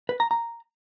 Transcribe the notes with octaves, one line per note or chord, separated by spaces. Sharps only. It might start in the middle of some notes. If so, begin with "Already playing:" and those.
B4
A#5
A#5